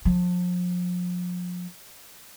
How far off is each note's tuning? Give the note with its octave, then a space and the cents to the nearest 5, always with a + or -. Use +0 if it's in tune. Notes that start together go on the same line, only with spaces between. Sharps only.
F3 +35